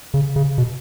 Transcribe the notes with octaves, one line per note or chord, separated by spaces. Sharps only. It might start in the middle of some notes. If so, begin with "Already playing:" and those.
C#3
C#3
B2